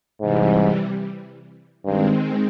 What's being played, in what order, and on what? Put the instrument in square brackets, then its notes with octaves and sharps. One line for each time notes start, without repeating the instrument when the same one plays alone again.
[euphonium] G#2 [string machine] C3 E3 G3
[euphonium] G2 [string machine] D#3 G#3 C4